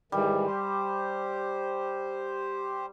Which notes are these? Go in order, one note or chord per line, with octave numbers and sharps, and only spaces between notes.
G#2 D#3 E3 G3
G4 C5